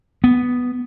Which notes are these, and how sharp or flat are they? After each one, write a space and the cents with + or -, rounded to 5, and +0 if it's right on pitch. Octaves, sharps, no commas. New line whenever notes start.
B3 +0